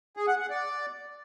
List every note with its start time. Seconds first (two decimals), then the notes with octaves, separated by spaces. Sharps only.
0.17 G#4
0.28 F#5
0.39 F#5
0.50 D5